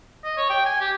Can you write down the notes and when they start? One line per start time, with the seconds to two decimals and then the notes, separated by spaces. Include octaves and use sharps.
0.24 D#5
0.37 C#5
0.50 G5
0.66 G#5
0.81 G4